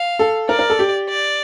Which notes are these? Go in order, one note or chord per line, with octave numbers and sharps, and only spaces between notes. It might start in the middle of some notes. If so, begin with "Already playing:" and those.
Already playing: F5
A4
A#4 D5
A#4
A4
G4
D5